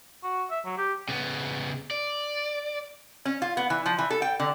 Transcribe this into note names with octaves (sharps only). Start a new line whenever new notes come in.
F#4
E5
F#3
G4
C#3 B3
D5
C#4
F4
B3
E3
F3
E3
A4
G5
D3